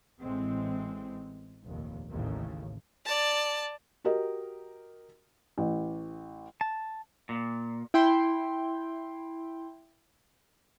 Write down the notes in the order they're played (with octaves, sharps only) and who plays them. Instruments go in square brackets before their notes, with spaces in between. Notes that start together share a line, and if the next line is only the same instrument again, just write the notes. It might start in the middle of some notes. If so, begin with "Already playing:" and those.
[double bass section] A1 A2 E3 G#3 C4
F1 A#1 D#2
A1 D#2 A2 C#3
[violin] D5 A5
[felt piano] F#4 G4 A#4 D#5
A1
[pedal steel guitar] A5
[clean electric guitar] A#2
[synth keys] E4 G5 C6